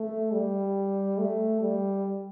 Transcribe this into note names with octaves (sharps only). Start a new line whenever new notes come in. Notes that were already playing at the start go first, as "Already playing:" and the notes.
Already playing: A3
G3
A3
G3